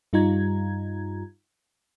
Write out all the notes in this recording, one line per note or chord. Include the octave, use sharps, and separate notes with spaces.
G2 G3 D#4 F4 A#5 G#6